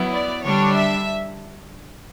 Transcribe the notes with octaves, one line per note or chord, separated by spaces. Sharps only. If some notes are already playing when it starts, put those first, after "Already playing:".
Already playing: F#3 B3 E4
D5
D3 G3 D4 C#5
E5